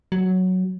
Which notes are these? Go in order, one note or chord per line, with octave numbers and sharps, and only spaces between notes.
F#3